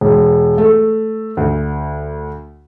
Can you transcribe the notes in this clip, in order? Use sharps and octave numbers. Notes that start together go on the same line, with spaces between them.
E1
A3
D2